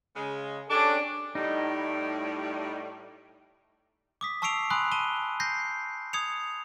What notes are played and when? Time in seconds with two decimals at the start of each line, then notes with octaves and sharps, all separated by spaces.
0.16 C#3 G#3
0.70 C#4 D4 G4 A4 D6
1.35 A2 G3 D#4
4.21 D6 D#6 B6
4.42 A5 C#6 E6 C7 D7 F7
4.70 G#5 B5 C6 D#6 F#6
4.92 A5 D#7 G7
5.40 G6 A#6 C7
6.13 D#6 G#6 C#7 F7